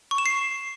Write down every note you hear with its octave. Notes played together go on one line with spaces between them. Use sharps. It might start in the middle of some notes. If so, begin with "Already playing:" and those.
C#6
E7
C7